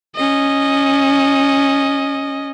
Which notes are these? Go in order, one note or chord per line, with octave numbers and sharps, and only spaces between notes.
C#4 D#5